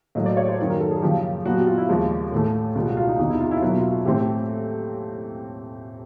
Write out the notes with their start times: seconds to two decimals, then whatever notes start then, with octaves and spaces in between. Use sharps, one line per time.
0.15 A2 F#3 A#3 D#5
0.26 D5
0.37 C#5
0.48 C5
0.58 F#2 D#3 F#3 A#3
0.70 A#4
0.80 A4
0.91 G#4
1.02 F#2 C#3 F3 A#3 G4
1.46 A#2 F#3 B3 F#4
1.56 G4
1.67 F4
1.78 E4
1.89 D#2 C#3 F3 G#3
2.32 A2 E3 A3
2.75 C#2 B2 G3 B3 F4
2.86 F#4
2.97 F4
3.08 D#4
3.19 E2 C3 E3 D#4
3.30 E4
3.40 F4
3.51 E4
3.57 F4
3.62 B2 F#3 A#3 E4
3.77 F4
3.91 F4
4.05 A2 E3 A3 C4 G4
4.20 G4